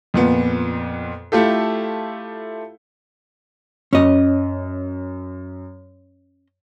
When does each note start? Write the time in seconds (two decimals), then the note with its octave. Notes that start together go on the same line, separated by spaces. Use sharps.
0.14 F2 A#2 B3
1.32 A3 E4 F4 G4 A4
3.93 F#2 C#4 D#5